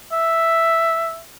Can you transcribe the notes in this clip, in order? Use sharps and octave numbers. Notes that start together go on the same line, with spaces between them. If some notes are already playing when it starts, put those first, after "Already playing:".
E5